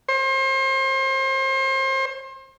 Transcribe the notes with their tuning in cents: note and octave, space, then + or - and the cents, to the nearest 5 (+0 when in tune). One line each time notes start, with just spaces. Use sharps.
C5 +35